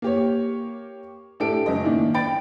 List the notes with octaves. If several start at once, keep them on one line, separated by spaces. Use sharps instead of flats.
A#3 G4 C#5
A2 D4 G4 A4 D7
F#1 C#2 D#5
A2 D#3 A#3 D4
G5 B5 A6 D7